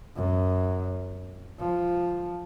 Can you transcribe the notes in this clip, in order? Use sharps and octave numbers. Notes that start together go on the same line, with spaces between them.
F#2
F3